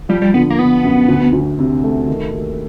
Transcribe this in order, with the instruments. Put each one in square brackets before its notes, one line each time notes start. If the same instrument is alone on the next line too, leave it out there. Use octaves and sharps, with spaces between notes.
[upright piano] F3 [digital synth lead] G3
[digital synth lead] G3
[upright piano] D3 [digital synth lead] B3
[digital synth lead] A#3
[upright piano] D3 [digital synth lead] B3
[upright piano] F#2
D2
D2
C3
A3
D#3
D#2